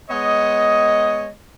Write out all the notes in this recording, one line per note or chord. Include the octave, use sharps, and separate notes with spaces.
G#3 B3 C#5 D#5